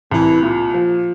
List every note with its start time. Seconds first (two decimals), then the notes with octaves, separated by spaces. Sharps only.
0.11 C2 E3
0.43 A#2
0.74 F3